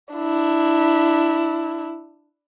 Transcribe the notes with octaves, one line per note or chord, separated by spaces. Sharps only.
D4 E4